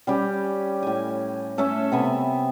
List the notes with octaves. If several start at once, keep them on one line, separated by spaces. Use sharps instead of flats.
G3 C#4 G4
A2 G#5
A3 C#4 A4 E5
C3 B3 G#5 B5